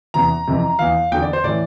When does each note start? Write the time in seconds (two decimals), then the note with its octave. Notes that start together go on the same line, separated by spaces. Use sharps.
0.14 E2 C3 E3 A#5
0.47 F2 C3 E3
0.79 E2 E3 F5
1.12 E2 D3 G5
1.22 D5
1.33 C5
1.44 A2 E3 D5